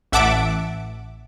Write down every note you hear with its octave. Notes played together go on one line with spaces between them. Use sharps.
A1 E5 F#5 A5 D6 D7